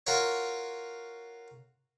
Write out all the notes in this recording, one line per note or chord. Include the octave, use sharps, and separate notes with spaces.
F4 F#4 A#4 C#5